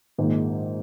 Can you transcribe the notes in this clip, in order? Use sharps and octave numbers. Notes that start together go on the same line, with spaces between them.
A#1 G#2 D#3 G#3